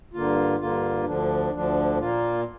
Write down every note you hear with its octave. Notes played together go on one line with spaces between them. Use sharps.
G2 D3 A#3 F4
G2 D3 A#3 F4
D2 D3 F3 D4
D2 D3 F3 D4
A#2 A#3 F4